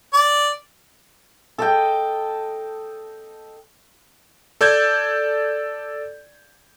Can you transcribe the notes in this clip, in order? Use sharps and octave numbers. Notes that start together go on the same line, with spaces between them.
D5
A4 D#5 G5
A4 D5 G6 G#6